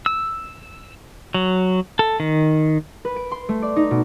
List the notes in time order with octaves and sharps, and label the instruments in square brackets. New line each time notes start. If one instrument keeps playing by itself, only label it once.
[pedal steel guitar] E6
F#3
A4
D#3
[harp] B4
D7
C6
A3
D5
D#4
B2